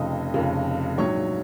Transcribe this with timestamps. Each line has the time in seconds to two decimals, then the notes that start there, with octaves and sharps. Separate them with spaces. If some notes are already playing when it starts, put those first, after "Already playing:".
Already playing: F1 F2 C#3 D#5
0.34 F1 F2 C#3
0.98 A#1 G#2 F#3 C#5 C#6